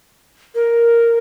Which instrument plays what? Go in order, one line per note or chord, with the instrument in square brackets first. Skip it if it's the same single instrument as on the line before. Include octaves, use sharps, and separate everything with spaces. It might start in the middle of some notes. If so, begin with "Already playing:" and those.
[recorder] A#4